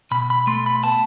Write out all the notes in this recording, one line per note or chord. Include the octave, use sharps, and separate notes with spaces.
B2 B5
B5
A3 C6
B5
B3 A5